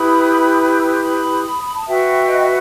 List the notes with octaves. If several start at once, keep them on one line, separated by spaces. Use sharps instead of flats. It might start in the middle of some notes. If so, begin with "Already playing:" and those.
Already playing: E4 G4 B4 B5 D#6
E6
D#6
C6
B5 D#6
B5
A5
F#4 B4 E5 G5
D#5
E5